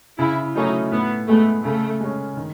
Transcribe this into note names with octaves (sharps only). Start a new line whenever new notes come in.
C#3 E4
F#3 A3 C#4 D#4 E4
A2 B3
G#3 A3 B3
C#3 A3
G#3 C#4
D#3